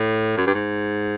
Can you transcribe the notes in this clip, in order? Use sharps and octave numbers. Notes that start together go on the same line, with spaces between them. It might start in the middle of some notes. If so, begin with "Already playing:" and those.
Already playing: A2
F#2
G2
G#2